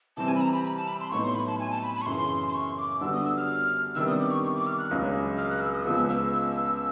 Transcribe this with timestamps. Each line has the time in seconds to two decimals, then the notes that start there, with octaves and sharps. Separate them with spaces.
0.17 C3 E3 G3 C4 A5
0.28 G#5
0.35 B5
0.41 A#5
0.53 B5
0.64 B5
0.76 A5
0.88 B5
1.00 C6
1.11 A2 F#3 B3 D#4 C#6
1.24 C6
1.35 B5
1.47 A5
1.59 G#5
1.71 A5
1.82 B5
1.95 B5
2.02 C#6
2.06 F#2 C#3 E3 C6
2.48 C6
2.54 C#6
2.78 D6
3.01 D3 G3 B3 D4 F#4 E6
3.13 D#6
3.25 E6
3.37 F6
3.95 C3 D#3 G3 B3 D4 E6
4.07 D#6
4.20 D6
4.31 C#6
4.43 C#6
4.55 D6
4.66 F6
4.78 F#6
4.91 C#2 C#3 F#3
5.38 F6
5.50 F#6
5.61 E6
5.73 D#6
5.85 C#2 C#3 F3 G#3 B3 E6
6.09 E6
6.33 E6